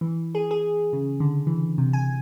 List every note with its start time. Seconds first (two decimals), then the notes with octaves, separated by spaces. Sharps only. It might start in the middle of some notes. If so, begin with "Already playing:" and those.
0.01 E3
0.35 G#4
0.51 G#4
0.93 C#3
1.20 D3
1.47 E3
1.78 C3
1.93 G#5